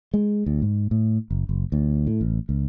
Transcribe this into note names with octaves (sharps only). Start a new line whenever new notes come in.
G#3
D2
G#2
A2
F#1
F#1
D2
A2
A1
C#2